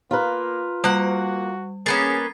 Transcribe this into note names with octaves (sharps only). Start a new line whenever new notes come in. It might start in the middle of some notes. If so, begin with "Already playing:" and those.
A#3 F4 A#4 B4
G3 A#3 F#4 F#5
A#3 B3 C#4 G#4 A6 C7